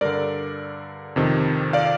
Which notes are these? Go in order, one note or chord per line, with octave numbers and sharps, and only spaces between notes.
G2 D3 A#4 D5
F2 C3 D#3
D5 F5